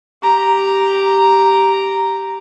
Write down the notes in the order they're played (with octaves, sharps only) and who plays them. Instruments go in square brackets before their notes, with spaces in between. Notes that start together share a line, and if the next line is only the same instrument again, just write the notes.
[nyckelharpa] G4 A#5